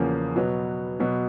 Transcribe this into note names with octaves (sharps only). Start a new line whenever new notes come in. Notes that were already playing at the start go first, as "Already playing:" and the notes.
Already playing: E2 C#3 F3 A#3 C#4
B2 F#3 B3
B2 F#3 B3